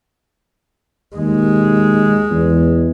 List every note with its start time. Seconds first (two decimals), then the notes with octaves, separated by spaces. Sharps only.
1.16 D#2 G#3
2.31 E2